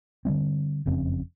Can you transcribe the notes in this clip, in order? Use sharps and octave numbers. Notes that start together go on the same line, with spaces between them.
D3 E3 G3 C4
F#1 F2 C#3 C4